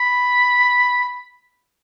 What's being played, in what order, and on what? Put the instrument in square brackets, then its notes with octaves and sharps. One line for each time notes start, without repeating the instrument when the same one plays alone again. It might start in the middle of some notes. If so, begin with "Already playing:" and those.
Already playing: [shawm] B5